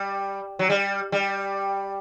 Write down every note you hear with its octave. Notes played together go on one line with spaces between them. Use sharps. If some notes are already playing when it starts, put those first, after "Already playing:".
Already playing: G3
F#3
G3
G3